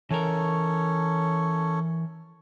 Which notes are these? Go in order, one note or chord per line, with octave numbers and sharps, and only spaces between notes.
E3 C#4 A4 A#4 C#5